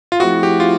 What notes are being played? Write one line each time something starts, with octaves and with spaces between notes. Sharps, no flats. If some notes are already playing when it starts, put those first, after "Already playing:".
F4
F3 A3 C4 E4 F#4 G#4
G4
F4